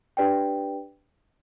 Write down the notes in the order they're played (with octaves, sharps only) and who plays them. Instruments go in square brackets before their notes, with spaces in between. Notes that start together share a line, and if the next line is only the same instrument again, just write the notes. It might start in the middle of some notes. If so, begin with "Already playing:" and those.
[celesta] D4 G4 B4 D5 G5